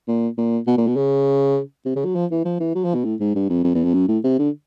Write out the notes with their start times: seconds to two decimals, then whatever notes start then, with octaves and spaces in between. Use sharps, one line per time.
0.08 A#2
0.38 A#2
0.67 B2
0.77 A#2
0.87 B2
0.96 C#3
1.85 C3
1.96 C#3
2.05 F#3
2.15 F3
2.31 E3
2.45 F3
2.60 E3
2.75 F#3
2.84 F3
2.94 B2
3.05 A2
3.20 G#2
3.35 G2
3.49 F2
3.64 F2
3.75 E2
3.84 F2
3.94 F#2
4.08 A2
4.24 C3
4.39 D3